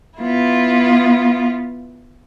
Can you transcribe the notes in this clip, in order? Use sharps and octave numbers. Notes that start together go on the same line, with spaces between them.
B3 E4 F4